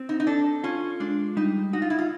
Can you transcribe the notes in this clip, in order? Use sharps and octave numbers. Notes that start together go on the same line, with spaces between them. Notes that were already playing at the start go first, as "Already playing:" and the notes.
Already playing: C4
D#4
D#4
D4 A4
C#4 F4
G#3 D4
G3 D#4
D#4 F#4
F4
E4
F4